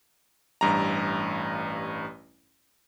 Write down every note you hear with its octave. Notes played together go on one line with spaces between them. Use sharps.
A1 G2 A#5